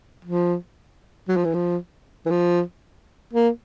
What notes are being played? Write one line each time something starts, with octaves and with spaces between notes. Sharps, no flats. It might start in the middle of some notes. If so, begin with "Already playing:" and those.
F3
F#3
F3
E3
F3
E3
F3
A#3